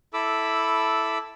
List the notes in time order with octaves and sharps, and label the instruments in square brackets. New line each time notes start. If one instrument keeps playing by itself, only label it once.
[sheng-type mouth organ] E4 A4 B5 D6 E6